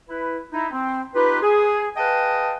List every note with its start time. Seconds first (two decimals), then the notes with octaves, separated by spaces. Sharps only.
0.09 E4 B4
0.52 D#4 E4
0.72 C4
1.15 D#4 F4 G4 B4
1.42 G#4
1.97 G#4 B4 D#5 F5 G5 A5